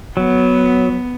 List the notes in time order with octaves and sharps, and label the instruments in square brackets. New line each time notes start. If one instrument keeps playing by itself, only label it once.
[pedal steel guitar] F#3 [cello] B3